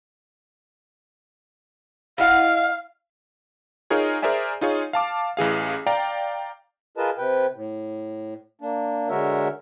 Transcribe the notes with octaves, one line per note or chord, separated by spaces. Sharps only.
E4 D#5 F5 F#5
D#4 F4 G#4 A#4 C#5
G#4 A#4 C5 D5 E5 G#5
D#4 F4 G#4 C#5
F5 A5 D6
A1 E3 G#4 F5
D5 F5 G5 A#5
F4 G#4 A#4 B4 D#5 A5
C3 B4 G5
A2
A#3 D4
D3 G#3 F#4 A#4 C#5 E5